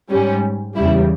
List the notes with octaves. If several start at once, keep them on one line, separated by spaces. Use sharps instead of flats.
G#2 G3 C#4
E2 C#3 G3 E4